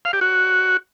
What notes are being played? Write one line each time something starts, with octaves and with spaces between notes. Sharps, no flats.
F5
G4
F#4